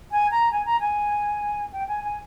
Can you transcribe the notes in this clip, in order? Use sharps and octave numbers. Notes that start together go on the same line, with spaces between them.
G#5
A#5
G#5
A#5
G#5
G5
G#5
G#5